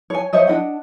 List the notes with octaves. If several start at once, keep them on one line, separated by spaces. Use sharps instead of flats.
C#5 G#5
C5 C#5 D#5 E5
D4 F#4 D#5 F#5